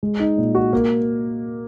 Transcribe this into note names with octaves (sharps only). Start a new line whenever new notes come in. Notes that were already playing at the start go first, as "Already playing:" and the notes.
G#3
D#4
A#2
F#4
A#3